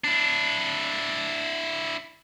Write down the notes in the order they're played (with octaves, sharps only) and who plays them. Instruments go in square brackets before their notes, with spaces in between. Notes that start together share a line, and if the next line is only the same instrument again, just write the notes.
[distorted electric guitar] D4 E4